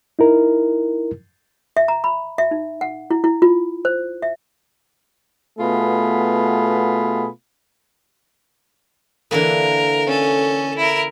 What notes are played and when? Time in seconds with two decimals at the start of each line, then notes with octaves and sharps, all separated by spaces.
0.19 D#4 E4 A#4
1.77 E5
1.88 A#5
2.04 B5
2.38 E5
2.51 D#4
2.81 F#5
3.11 E4
3.24 E4
3.42 F4
3.85 C5
4.22 E5
5.59 B2 A3 B3 F4 G#4 B5
9.31 D3 E3 A#3 A#4
10.07 C#4 A4
10.77 E4 A#4